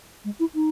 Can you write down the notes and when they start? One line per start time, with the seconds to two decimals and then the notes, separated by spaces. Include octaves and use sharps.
0.24 G#3
0.40 E4
0.55 D#4